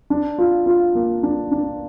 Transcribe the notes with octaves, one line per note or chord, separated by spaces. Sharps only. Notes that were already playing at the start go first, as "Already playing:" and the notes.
D4
F4
F4
A#3
D4
D4